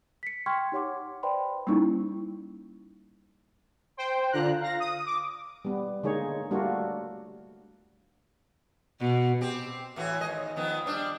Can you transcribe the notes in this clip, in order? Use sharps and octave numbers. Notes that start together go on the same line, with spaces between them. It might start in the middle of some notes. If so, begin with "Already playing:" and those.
B6 C#7
G5 C6 C#6 F6 G#6
D#4 G4 C#5 F#5 C6 D6
B4 C5 D5 G5 B5 C6
G3 A#3 C#4 D#4 E4
C5 G5
D3 F4 A#5 F#6
F5 A#6
D#6
D6
G3 B3
D3 G#3 A#3 D#4 G#4 C#5
G3 A3 A#3 D4 F4 F#4
B2
C4 G4
A2 E3 F#4
D#2 G#2 D#5
D#3 F3 B3
G3 D4